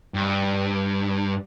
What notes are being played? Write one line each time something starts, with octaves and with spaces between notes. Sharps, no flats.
G2